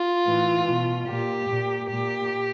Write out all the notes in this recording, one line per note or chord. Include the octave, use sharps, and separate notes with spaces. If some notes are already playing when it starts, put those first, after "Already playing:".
Already playing: F4
A2 E3
B2
A#2 G4
A#2
A#2 G4